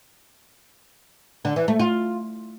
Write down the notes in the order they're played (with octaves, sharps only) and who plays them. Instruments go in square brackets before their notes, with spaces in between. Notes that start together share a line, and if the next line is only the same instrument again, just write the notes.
[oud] D3
E3
A3
F4